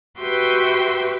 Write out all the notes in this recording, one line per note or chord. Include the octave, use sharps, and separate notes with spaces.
F#4 G4 B4 E5 G5 C6